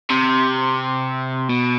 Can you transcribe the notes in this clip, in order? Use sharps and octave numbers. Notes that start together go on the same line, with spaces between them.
C3
B2